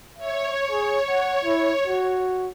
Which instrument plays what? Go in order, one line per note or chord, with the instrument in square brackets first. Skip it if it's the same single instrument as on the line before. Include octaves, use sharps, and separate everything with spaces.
[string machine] C#5 [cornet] E5
[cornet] G#4
F#5
E4
F#4